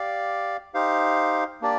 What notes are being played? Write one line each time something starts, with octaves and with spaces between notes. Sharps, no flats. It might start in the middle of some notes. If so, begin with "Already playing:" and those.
Already playing: G4 D5 F5
D#4 G4 C5 F5
A#3 D4 G4 D5